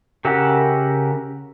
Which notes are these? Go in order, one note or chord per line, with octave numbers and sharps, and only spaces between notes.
C#3 G4 A#4 E5 F#5